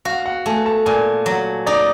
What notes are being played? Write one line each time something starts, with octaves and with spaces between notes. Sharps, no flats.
F#4 F5
F#5
A3 G#5
A5
A#2 G#5
F#3
D#4 D5